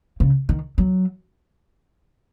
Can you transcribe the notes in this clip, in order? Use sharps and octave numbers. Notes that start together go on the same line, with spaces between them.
C#3
D#3
F#3